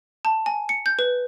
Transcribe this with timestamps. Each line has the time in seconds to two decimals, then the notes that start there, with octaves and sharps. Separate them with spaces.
0.25 A5
0.46 G#5
0.69 C#7
0.86 G6
0.99 B4